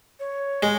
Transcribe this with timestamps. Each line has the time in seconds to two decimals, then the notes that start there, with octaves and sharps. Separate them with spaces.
0.20 C#5
0.63 G#3